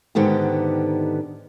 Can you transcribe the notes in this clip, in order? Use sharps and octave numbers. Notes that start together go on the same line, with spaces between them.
G#2 D3 D#3 B3 G4